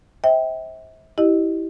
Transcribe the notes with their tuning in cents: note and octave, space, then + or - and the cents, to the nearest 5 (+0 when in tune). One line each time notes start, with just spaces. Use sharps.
C5 +25 E5 -35 G5 +0
E4 -10 G4 -15 D#5 -15